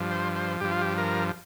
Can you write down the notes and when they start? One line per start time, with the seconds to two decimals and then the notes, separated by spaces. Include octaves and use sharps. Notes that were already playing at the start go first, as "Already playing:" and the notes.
Already playing: G2 F3
0.11 C5
0.36 C5
0.61 G2 F3 G4
0.71 F4
0.82 G4
0.98 A#4